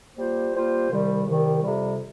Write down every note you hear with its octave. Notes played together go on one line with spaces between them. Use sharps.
G3 A#3 F4 C5
G3 A#3 F4 C5
C2 C3 D#3 G3
C2 C3 D#3 G3
F2 C3 G3